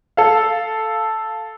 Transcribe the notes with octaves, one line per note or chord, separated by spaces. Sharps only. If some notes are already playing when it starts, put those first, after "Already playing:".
A4 F5